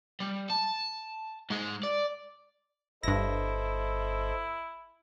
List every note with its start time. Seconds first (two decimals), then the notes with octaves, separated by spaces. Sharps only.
0.20 G3
0.50 A5
1.50 G#2 G#3
1.83 D5
3.03 G1 G2 E4 A4 C5 D#5 A#6